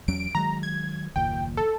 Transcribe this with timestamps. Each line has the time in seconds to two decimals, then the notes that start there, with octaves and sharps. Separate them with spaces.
0.08 E2 F#3 C#4 D7
0.35 D#3 F#3 G#3 A#5
0.63 G#6
1.16 F#1 D#2 A#2 G5
1.57 A4